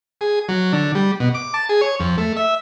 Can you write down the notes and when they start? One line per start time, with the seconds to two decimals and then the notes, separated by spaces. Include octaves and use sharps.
0.21 G#4
0.49 F#3
0.73 D3
0.95 G3
1.20 B2
1.34 D6
1.54 A5
1.69 G#4
1.81 C#5
2.00 F2
2.18 A3
2.37 E5